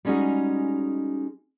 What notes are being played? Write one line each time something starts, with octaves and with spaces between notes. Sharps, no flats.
G3 G#3 C#4 D#4 F#4 G#4